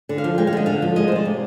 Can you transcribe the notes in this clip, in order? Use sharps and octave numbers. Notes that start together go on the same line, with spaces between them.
D3
F5
F3
G#3 G5
F5
D3 D#5
D3 F5
F3
G#3 D#5
C5
C3 D5
C3